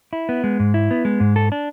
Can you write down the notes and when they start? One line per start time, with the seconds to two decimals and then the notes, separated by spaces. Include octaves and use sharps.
0.13 E4
0.29 B3
0.44 G#3
0.60 G#2
0.74 E4
0.91 B3
1.05 G#3
1.20 G#2
1.36 A4
1.52 D4